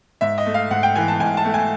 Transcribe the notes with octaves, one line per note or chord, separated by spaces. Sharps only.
G#2 E5
D#5
A3
F5
G#2 F#5
G5
E3 G#5
A5
G#2 G#5
A5
A3
G#5